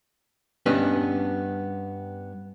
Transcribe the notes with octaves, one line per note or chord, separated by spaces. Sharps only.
G2 B3 C#4 D4 B4 D#5